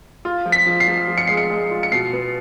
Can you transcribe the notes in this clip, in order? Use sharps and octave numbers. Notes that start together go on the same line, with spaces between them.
F4
F3
B6
F3
C7
F3
F3
C#7
G#3 C7
C#7
G#3
F4
C#7
B2 C7
B3